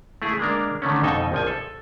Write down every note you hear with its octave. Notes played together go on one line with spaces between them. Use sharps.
A3 E4 G#4
G#3 A#3 D4 A#4
D3 D#3 A3 C#4
F2 B2 D#4 A4 D#5 G#5
A#1 F3 G#5
A4